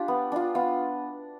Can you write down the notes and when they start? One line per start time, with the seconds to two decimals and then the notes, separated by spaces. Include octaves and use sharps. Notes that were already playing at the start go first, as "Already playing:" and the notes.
Already playing: D4 F4 G4
0.08 B3
0.32 D4 F4
0.55 B3 F4